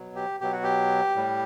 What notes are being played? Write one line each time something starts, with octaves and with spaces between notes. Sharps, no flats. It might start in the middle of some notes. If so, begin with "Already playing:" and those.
Already playing: B2 F#3
G4
B2 F#3 G4
F#4
G4
A2 G3